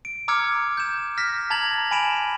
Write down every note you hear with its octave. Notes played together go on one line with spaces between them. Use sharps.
D7
A#5 D6 E6 F6 G#6 C#7
G6 E7
F6 A#6 B6
A5 A#5 G#6 A6 F#7
G#5 B5 D7 E7 F7